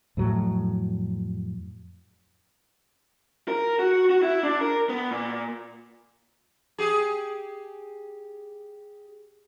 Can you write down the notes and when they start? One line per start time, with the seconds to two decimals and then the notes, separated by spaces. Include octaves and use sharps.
0.17 F2 A2 F#3
3.48 A#4
3.79 F#4
4.10 F#4
4.23 E4
4.43 D4
4.61 A#4
4.89 B3
5.11 A#2
6.78 G4 G#4